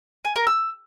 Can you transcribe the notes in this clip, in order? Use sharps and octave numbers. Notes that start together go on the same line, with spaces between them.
G#5
A#4
E6